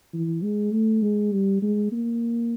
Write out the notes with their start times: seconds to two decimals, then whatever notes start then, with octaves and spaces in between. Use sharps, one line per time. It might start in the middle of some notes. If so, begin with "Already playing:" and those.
0.14 E3
0.43 G#3
0.73 A3
1.02 G#3
1.32 G3
1.62 G#3
1.92 A#3